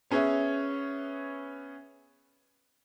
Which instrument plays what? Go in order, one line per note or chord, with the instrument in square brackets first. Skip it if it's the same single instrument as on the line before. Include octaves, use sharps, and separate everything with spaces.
[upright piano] B3 C#4 G#4 C#5 E5